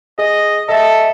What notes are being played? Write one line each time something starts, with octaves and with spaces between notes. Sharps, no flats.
G#4 D#5
A4 D#5 E5 A5